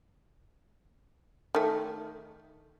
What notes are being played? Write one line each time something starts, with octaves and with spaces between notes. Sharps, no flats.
D#3 A3